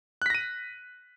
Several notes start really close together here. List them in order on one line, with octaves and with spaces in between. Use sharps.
F#6 B6 A#6 D#7